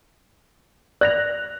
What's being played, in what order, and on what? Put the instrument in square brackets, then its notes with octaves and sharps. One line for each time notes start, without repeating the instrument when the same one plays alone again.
[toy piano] D5 [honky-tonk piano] F#6 A#6 F7